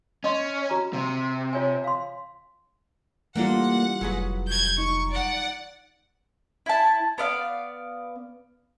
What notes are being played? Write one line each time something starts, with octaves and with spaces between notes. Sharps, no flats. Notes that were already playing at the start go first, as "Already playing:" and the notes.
C#4 D#5 C6
F#4 A#5
C3
F4 C#5 G#5
F5 C6
E3 G3 A#3 D4 F4 A4 F#5
F1 F#3 G#4 B4
G6 G#6
D#4 C#6
D5 F#5
E4 A5
B3 D5 E5 F5